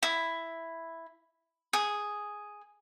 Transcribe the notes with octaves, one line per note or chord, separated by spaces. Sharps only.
E4
G#4